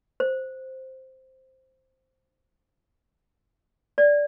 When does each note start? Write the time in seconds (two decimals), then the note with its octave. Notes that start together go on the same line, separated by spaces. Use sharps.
0.20 C5
3.98 D5